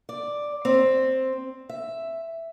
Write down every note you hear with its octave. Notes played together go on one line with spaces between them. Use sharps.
D5
C4
E5